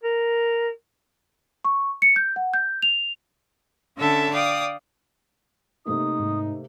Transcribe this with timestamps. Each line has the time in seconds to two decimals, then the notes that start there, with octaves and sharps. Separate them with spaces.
0.03 A#4
1.65 C#6
2.02 C#7
2.16 G6
2.36 F#5
2.54 G6
2.82 F7
3.97 D3 C#4 A4 E5 A5
4.33 D5 F5 G5 D#6
5.86 C3 A3 A#3 D#4 D#6
6.19 G#2